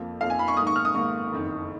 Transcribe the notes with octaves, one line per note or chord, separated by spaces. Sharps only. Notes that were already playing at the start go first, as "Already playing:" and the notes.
Already playing: F2 F3 A#3
F2 F3 A#3 F5
G#5
B5
C#6
G#2 D#3 A#3 D#6
C#6
F6
D#6
G#2 D#3 A#3 C#6
F#1 F2 D#3